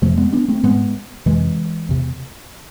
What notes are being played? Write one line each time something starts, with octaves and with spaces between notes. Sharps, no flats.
F2 C3 F3 A3
G#3 B3
B3 D4
A3 C4
G#2 G#3 B3
F2 C3 E3 G#3
E2 C3